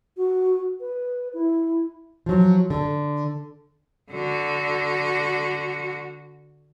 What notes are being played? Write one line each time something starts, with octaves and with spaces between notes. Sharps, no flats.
F#4
B4
E4
F3 F#3
D3
D3 F#4